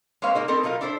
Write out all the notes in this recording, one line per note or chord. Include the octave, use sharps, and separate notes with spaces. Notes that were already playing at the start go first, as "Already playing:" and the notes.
G#3 A#3 C4 B4 C#5 F5
A#2 F3 A#3 D#4 G#4
A3 B3 C4 D#4 A4 A#4
B2 F#3 D#4 F4 A#4
D4 E4 A4 C5